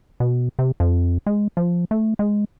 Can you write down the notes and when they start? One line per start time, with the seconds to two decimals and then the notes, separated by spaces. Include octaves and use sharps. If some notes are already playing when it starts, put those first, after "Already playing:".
0.20 B2
0.59 C3
0.80 F2
1.26 G#3
1.57 F3
1.91 A3
2.19 G#3